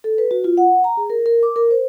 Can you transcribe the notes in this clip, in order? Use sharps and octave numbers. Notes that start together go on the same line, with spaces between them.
A4
B4
F#4
F4
F#5
A#5
G#4
A#4
A#4
D6
A#4
C5